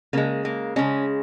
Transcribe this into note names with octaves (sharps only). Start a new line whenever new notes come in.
C#3 G#3 A#3
A#3
C#3 G#3 C#4